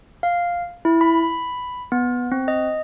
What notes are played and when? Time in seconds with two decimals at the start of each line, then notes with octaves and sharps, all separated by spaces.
0.23 F5
0.85 E4
1.01 B5
1.92 B3
2.32 C4
2.48 D#5